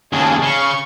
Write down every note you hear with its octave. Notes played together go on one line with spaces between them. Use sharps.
D#2 C#3 G#4 A5
C#3 C#6